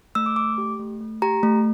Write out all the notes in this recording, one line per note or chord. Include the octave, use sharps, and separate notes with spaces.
A3 E6
D6
A3 D6
G4
A3
A3
G4 A#5
A3